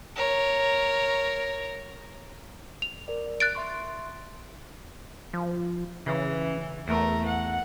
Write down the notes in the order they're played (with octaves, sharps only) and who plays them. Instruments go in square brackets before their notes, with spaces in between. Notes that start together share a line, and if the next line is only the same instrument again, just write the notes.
[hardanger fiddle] A#4 C#5
[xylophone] F7
[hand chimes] A#4 D5
[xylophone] F#6 A6 D7
[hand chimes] E5 C6 C#6
[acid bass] F3
[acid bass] C#3 [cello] E3
[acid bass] E2 [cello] A3 A#4
[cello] F#5